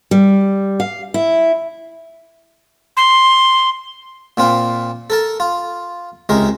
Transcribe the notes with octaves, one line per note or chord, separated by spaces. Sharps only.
G3
F5
E4
C6
A#2 C4 F4
A4 A#4 A5
F4
C#2 C3 G#3 A#4